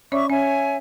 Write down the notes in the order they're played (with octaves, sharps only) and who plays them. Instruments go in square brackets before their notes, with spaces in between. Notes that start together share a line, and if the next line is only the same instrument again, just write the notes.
[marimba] C#4 C#5 D5 [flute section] E5 C#6 D6
[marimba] C#4 [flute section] C#5 E5 G#5